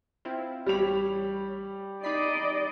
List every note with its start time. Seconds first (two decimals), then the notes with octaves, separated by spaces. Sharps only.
0.25 C4 E4 F4
0.66 A1 G3 C#5 B5 F7
2.03 D#4 D5 D#5 B5 C7